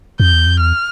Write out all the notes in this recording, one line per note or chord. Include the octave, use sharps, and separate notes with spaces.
F2 G6
E2
F2
E2 F6